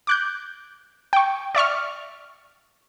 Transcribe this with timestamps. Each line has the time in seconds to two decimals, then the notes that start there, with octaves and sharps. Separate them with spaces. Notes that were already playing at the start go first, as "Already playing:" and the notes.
0.07 D6 F#6 G6
1.13 G5 C#6
1.55 D5 E5 C#6 F6